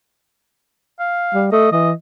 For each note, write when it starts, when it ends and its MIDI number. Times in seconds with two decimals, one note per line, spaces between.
0.99 1.45 77
1.34 1.48 55
1.52 1.71 57
1.52 1.70 75
1.72 1.92 52
1.72 1.90 75